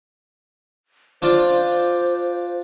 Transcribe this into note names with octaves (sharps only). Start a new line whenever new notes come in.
D4 F4 C5 D5